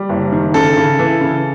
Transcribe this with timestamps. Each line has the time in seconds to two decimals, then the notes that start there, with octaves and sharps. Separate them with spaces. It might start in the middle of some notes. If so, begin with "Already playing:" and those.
Already playing: G3
0.09 F#1
0.32 D#3
0.54 C#3 A4
0.77 C#3
0.99 E3
1.21 C#3